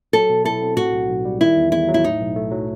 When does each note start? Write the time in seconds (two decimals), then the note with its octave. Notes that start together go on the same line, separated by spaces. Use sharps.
0.13 F#3 A4
0.30 B2
0.45 E4 A4
0.62 C4
0.77 A2 F#4
0.93 B1
1.09 B1
1.25 G3
1.41 D#3 E4
1.57 E2
1.72 E2 E4
1.88 F#3
1.94 E4
2.04 A2 D#4
2.20 B1
2.36 A3
2.51 F#3